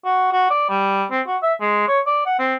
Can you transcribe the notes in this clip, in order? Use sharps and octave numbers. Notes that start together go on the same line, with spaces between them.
F#4
F#4
D5
G3
C4
F#4
E5
G#3
C#5
D5
F#5
C4